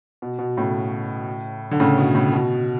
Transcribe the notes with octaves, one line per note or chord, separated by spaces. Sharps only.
B2
B2
A2 C#3
D3
A2 C#3
B2
A2
B2